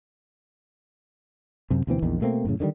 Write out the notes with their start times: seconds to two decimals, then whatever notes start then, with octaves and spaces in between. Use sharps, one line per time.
1.70 F#2 C3
1.87 D2 B2 E3 C4
2.02 A#1 E2 D#3
2.21 B2 A3 A#3 C4
2.45 F#2 A2 C#3
2.60 D3 D#3 F3 G3